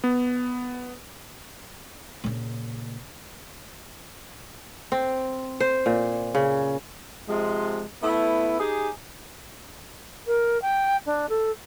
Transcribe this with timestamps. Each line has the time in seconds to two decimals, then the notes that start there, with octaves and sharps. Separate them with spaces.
0.04 B3
2.24 A#2 C#3
4.92 C4
5.60 C5
5.86 A#2
6.35 C#3
7.27 C3 F3 G#3
8.02 A3 B3 E4
8.59 D#4 G4 G#4
10.26 A#4
10.61 G5
11.06 D4
11.29 A4